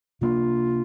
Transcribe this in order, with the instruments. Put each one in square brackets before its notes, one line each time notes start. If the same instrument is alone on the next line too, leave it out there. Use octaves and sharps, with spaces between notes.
[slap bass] C3 A#3 D4 [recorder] F4